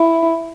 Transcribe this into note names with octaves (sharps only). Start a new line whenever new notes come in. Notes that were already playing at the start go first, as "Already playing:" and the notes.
Already playing: E4